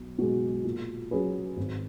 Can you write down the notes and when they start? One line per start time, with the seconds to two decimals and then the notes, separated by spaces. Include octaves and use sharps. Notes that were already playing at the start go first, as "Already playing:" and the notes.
Already playing: B1
0.18 B2 G#3
0.64 A#2
1.11 F#3 C#4 G#4 B4
1.57 G#1